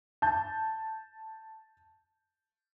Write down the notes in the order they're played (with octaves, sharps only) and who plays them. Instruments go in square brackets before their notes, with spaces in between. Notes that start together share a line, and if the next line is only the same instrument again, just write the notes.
[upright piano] A5 G6